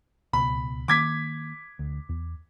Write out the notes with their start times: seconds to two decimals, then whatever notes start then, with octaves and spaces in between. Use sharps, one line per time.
0.33 D1 C#2 B2 B5
0.88 D#3 A#3 D6 G#6 B6
1.79 D2
2.09 E2